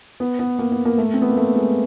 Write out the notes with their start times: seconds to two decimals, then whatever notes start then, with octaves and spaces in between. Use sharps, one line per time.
0.20 B3
0.39 B3
0.59 A#3
0.72 B3
0.85 A#3
0.98 A3
1.14 C4
1.22 B3
1.29 A#3
1.37 A3
1.56 G#3